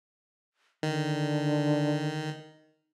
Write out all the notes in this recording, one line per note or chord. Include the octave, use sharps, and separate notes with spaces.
D3 D#3